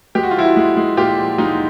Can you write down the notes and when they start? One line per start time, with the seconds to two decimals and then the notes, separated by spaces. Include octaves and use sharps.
0.15 G#3 G4
0.23 F#4
0.31 F4
0.36 F3 E4 F#4
0.57 G#3
0.77 G#3
0.97 A#2 F4 G4
1.18 F3
1.38 G#3 D#4 F4